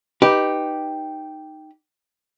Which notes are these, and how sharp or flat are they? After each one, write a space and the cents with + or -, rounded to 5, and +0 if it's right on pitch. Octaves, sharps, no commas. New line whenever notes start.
D#4 -5 G4 +0 B4 +0